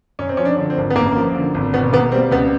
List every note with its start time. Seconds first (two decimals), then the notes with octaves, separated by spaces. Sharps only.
0.19 F#2 C#4
0.29 C4
0.37 F3 C#4
0.45 D4
0.58 D3
0.70 C4
0.77 G#1
0.90 B3
0.96 F#2 A#3
1.16 F3
1.35 D3
1.54 G#1
1.74 B2 B3
1.93 A#3 B3
2.12 G3 C4
2.31 C#2 B3